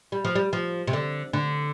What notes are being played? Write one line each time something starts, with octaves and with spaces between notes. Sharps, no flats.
G3
F3
G3
F3
C3
D3
D3